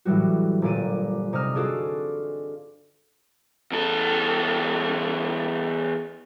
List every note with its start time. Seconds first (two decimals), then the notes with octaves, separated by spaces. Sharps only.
0.05 A2 E3 F#3 G3 F#4
0.62 G1 A#2 D5 D#7
1.33 C3 D#4 D#5 D#6 F6 E7
1.55 D4 F4 F#4 G#4 A4 D5
3.71 E2 A4